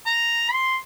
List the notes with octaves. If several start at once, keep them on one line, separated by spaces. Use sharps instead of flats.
A#5
C6